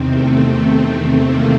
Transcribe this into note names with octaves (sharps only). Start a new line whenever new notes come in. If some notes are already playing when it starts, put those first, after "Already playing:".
Already playing: E2 C3 D#3 C4
A3
A3
A3
A#3